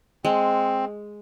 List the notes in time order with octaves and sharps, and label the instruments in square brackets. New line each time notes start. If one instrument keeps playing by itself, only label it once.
[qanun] G#3 [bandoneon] C4